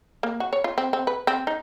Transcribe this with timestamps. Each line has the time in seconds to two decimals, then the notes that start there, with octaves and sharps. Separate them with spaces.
0.23 A#3
0.40 F#4
0.53 C#5
0.64 F4
0.78 C4
0.93 C4
1.07 B4
1.27 C4
1.47 D#4